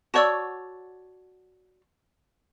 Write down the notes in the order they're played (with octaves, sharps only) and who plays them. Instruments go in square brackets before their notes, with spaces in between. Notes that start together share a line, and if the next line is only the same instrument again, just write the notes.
[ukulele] F#4 C#5 D5 [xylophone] A5 C#6 E6